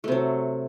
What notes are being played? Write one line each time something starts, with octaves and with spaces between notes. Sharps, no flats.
C3 F#3 A3